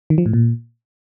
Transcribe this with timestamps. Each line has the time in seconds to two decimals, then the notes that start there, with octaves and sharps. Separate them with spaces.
0.10 D#3
0.18 F3
0.26 A2
0.33 A#2